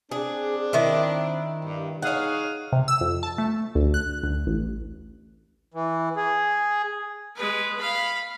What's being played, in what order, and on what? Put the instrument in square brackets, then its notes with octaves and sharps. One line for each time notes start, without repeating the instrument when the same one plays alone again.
[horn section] C4 D4 [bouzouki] G#4
[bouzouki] D#3 E4
[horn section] G2
[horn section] D#4 G#4 F5 [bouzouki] C#5 F#5
[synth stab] C3
E6
F2
A5
A3
D2
F#6
D2
A1
[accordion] E3
G#4
[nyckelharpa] G#3 B4
F5 B5